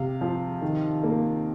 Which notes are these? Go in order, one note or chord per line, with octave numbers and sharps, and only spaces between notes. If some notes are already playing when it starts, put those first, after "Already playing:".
Already playing: C3 F5
F3
D#3
A#3